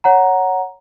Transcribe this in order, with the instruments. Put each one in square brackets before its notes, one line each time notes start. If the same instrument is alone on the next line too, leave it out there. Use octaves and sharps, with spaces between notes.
[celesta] C#5 F#5 A#5